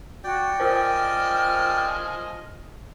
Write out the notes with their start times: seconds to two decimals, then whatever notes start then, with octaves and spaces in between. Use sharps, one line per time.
0.24 F#4 D5 G5
0.60 F3 F4 A#4 C5 D#5 G#5 F6